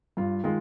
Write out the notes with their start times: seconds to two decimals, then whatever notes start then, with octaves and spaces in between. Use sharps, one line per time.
0.17 G2 F4
0.44 D#3 G#3 F4